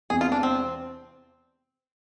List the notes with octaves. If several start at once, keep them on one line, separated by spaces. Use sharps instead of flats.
E2 C3 G#3 G#4
F4
D4
C4